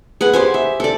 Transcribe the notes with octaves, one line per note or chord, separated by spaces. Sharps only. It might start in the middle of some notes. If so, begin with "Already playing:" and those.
G#4 B4 F#5
G4 C5 G#5
E5
A4 D5